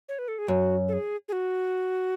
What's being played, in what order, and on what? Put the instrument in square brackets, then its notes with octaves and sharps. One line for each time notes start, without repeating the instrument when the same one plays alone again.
[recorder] C#5
B4
A4
G#4
[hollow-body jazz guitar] F#2 [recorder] F#4
[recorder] A4
G#4
G#4
F#4